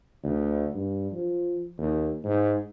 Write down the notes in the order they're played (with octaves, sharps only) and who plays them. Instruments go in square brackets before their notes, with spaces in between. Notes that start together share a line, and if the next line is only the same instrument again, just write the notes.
[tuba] D2
G2
F3
D#2
G#2